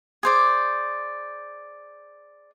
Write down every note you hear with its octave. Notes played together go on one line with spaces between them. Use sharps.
G#4 C5 D5